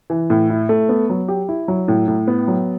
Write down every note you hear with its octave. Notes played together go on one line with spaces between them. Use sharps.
E3
A2
E4
A3
B3
F#3
G4
E4
F#3
A2
A2
B3
F#3